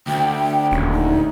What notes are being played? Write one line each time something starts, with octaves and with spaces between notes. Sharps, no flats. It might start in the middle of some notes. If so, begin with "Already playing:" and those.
D2 G5
D#1 C#4
D#4